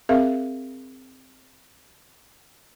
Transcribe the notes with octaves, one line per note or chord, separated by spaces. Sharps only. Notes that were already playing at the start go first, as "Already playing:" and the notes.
C4 G#4 A#4 E5 F5